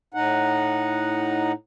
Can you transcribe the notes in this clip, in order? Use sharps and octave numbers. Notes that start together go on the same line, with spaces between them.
A2 D#4 F#5